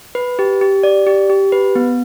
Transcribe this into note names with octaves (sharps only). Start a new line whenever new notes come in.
B4
G4
G4
D5
G4
G4
B4
B3